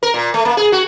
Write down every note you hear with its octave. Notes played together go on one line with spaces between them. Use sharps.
A#4
A#2
A3
A#3
G#4
F#4